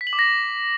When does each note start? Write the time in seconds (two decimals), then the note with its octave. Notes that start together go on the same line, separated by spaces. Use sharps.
0.01 B6
0.07 F#7
0.13 D6
0.19 A#6